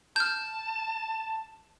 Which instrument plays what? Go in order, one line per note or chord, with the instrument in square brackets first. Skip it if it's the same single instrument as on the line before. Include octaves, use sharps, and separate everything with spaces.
[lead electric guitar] A5 [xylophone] F6 G6